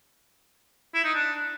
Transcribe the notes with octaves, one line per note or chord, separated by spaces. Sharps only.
E4
D#4
D4